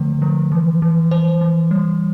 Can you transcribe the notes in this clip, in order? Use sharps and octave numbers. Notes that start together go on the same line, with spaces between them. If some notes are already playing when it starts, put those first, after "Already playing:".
Already playing: D3 F3 A3
F3
E3
E3
E3 C5
E3
G3